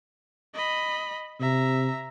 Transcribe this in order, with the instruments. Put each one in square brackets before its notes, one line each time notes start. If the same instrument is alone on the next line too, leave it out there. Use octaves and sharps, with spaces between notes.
[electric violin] D#5 B5
[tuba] C3 [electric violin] E5 A#5